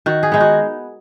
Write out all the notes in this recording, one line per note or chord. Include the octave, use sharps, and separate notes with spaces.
D#3 F#4
G#4
G#3 B3 D#4
F#4